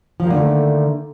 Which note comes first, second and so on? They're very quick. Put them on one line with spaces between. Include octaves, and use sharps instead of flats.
F3 D#3 A#3 D3 A3